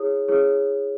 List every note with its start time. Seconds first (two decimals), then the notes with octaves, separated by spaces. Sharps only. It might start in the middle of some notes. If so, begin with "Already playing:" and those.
Already playing: E4 G#4 C#5 D#6
0.28 E4 G#4 C#5